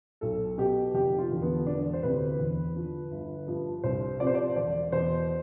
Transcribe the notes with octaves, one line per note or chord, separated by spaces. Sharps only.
B1 A4
B2 G4
F1 G4
F4
E2 D3 F3
B3
E1 D4
C5
D2 C3 E3 B4
E2
D3 F3
G1
G2 F3
C2 C5
C3 F3 D5
C5
D5
E1 D5
E2 B2 C5